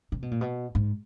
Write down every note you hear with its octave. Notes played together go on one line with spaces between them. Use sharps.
C3
B2
A#2
B2
G#2